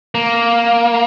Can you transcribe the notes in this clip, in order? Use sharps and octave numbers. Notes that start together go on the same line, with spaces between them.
A#3